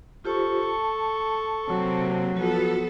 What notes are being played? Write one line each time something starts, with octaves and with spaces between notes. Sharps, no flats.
F4 G4 A4 C5 C#6
A5
C3 F#3 A#3 C4
F3 B3 F4 F#4 A4